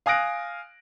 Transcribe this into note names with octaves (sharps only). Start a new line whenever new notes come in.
F5 G#5 D#6 F#6 A#6 D7